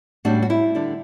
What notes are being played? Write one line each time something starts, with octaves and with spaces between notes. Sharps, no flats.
A2 G3 C#4 D4 F#4
F#4
E4
D3 G3 D4